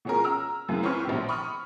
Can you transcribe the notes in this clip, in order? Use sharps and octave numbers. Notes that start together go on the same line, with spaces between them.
B2 F3 C#4 G#4 A#4
A#5 E6 F6
F#2 C#3 E3
C4 C#4 E4 B4 C#6 F6
A#1 B2 G4
B5 C#6 D#6 F6